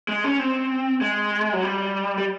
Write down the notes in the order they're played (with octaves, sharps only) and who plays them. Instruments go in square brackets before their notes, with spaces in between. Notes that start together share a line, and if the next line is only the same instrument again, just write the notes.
[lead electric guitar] G#3
C#4
C4
G#3
F#3
G3
G3